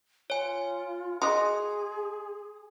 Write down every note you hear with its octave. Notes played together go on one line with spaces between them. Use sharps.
F4 C#5 G#5
F#4 G#4 D#5 C6